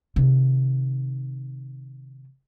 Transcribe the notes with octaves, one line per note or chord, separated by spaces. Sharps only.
C3 D#3